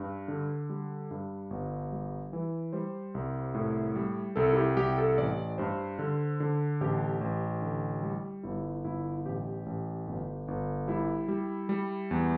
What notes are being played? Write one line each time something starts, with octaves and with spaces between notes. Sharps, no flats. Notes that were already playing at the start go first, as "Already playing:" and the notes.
Already playing: G2
D3
G3
G2
G1
G3
E3
G3 C5
C2
A2
G3
C2 A4
E4
G4
C2 G4
A4
A1 D5
G2 C5
D3
D3
A1 G4
A1
D3
G3
G1 E4
G1 E4
A1 G4
A1
G1
G1
G3 E4
G3
G3
E2